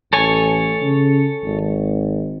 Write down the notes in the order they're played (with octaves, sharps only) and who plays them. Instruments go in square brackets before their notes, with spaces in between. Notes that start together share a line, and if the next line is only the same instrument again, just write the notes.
[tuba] A1 [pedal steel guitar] A4 C#5 G#5
[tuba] C#3
G#1